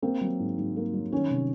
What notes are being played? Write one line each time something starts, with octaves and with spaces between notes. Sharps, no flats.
A#3 C4
F#3
G#2
G#2
A#3
F#3
D#3 C#4
C3